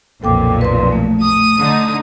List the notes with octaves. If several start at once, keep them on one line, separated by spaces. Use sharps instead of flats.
B1 F2 A#2 A4 G5 D6
B4 D5 C6
A3
D#6 D#7
D3 D#4